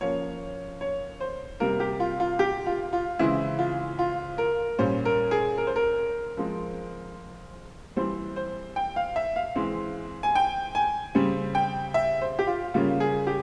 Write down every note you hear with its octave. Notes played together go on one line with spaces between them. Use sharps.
F3 A#3 C#4 C#5
C#5
C5
C3 G3 A#3 A#4
G4
F4
F4
G4
F4
F4
C#3 E3 G#3 C4 E4
F4
F4
A#4
A#2 G3 C#4 C5
A#4
G#4
A#4
C5
A#4
F3 G#3 C4
E3 G3 C4 C5
C5
G5
F5
E5
F5
E3 G#3 C4
G#5
G5
G#5
C#3 G3 C4
G5
E5
C5
G4
F4
C#3 G3 A#3 C#4 F4
G#4
G4